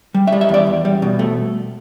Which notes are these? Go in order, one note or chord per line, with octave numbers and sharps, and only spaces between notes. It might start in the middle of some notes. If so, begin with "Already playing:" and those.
G3
E5
G3
E5
E2 D5
E2
G3
B2
A3